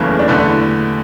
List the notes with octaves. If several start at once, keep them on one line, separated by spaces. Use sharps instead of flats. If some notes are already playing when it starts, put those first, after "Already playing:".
Already playing: F#1 E2 C#3 E3 A3
D4
E2 D3 A3 E4